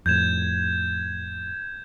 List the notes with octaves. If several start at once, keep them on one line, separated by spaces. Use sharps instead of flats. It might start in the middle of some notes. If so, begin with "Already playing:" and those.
F2 A2 G6 G#6 E7